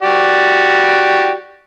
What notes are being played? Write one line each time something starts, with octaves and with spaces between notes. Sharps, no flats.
F#4 G4 D5